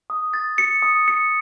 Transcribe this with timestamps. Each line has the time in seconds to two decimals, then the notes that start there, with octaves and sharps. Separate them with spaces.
0.10 D#6
0.34 A6
0.58 C#7
0.82 D#6
1.08 C#7